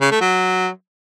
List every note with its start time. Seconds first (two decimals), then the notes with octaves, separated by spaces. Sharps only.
0.01 C#3
0.11 A3
0.21 F#3